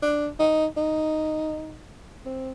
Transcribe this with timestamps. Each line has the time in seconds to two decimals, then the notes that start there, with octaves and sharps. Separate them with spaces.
0.02 D4
0.39 D#4
0.77 D#4
2.26 C4